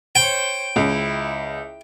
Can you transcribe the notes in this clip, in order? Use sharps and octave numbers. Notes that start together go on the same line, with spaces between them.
C5 C#5 G5
C#2 E4